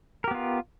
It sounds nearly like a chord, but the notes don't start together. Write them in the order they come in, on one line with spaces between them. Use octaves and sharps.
A#4 G4 B3 F4